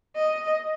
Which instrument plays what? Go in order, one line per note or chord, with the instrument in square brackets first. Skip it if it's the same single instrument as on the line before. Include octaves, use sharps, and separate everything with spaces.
[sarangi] D#5